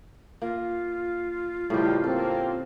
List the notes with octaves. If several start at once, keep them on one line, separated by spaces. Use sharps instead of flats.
A#3 F4
B1 A2 C#3 F3 G3 G4
A#3 C4 A4